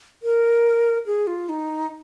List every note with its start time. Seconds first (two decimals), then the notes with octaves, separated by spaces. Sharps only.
0.23 A#4
1.06 G#4
1.27 F4
1.49 D#4